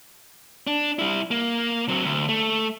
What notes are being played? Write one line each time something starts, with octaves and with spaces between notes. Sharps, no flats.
D4
G3 E4
A#3
F#3 C4
D2
A3